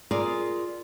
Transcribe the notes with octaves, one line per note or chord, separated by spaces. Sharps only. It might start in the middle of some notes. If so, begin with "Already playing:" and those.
F4 G#4 A#4 D5